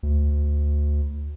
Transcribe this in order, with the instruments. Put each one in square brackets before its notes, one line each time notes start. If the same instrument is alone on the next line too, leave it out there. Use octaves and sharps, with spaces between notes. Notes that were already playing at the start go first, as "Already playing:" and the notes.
[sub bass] D2